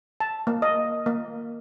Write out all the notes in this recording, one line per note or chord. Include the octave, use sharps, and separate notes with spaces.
A5
A#3
D#5
A#3